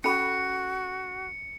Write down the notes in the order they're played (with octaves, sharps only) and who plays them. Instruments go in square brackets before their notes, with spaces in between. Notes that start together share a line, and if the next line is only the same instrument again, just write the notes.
[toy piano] C#4 A4 B5 [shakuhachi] F#4 [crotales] C#7